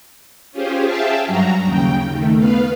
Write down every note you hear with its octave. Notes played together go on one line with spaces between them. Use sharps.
C#4 F4 G4 G#4 C5
G#4 E5 F5 G5 A5
G2 F#3 F#4 A#5
D#2 C#3 G5
D#3 A3
B3 B4 F5